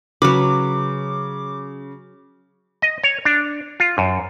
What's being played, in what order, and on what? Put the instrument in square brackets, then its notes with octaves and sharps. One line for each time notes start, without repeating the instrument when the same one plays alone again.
[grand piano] C#3 [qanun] F#3 B4 [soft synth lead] D6
[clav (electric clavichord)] D#5
C#5
D4
F4
F#2